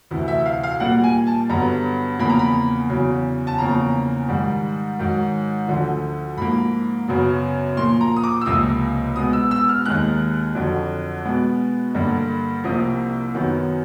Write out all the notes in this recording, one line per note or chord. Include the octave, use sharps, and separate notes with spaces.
D2 C3 E3
E5
F5
F5
A#2 G3 A#3 F#5
G#5
A5
G2 D3 F#3 B3 A#5
E2 C#3 F3 A#3 B5
A#5
B5
E2 C#3 F#3
A5
E2 C#3 F3 A#3 A#5
G#2 D#3 G3
G#2 D#3 F#3
D2 D3 F3
G#2 F3 A#3 B5
F#2 C#3 F#3 B3
A#2 F3 A#3 C6
A#5
D#6
D6
E6
C#2 C3 F3 A#3 D#6
B2 G#3 B3 D#6
E6
E6
F6
D#2 D#3 G#3 F#6
F2 D3 F#3
B2 G#3 B3
G2 D3 G3 A#3
C2 C3 F3 A#3 D#6
F#2 D#3 F#3 B3